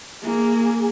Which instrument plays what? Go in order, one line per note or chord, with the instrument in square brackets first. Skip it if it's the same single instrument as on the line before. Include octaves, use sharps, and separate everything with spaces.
[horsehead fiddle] A#3 G#4